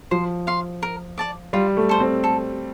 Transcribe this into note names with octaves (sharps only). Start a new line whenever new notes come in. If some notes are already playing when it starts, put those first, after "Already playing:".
F3 C5
F5 C6
A#4
D5 A5 D6
G3 F4
A3
A4 C5
C4
A4